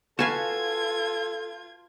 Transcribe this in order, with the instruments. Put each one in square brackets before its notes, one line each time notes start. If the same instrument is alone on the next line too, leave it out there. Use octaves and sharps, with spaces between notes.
[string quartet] F4 G#6 [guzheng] F#4 B4 F5 [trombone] A4 [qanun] G#5 A5